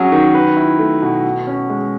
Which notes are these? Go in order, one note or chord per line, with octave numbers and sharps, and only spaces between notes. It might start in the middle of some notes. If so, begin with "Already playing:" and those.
Already playing: F#3 C#4 G#4
D#3
B4
E4
A3
B2
F#4
C#4
G#3